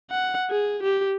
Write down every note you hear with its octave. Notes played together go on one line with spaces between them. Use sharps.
F#5
G#4
G4